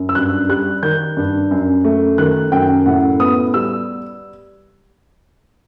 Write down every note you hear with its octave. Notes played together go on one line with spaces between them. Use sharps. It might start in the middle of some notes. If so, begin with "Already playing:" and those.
Already playing: F#2
E6
G2 F#6
G3 F#6
D#3 G6
G2
F#2
A3
D#3 F#6
F#2 G5
A2 F#5
B3 D#6
G3 E6